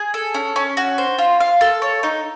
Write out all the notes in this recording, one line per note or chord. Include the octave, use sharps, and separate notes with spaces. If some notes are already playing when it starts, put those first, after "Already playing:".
Already playing: G#4
A4
C#4
C#4
F#4
C5
F4
F5
A4
C#5
D#4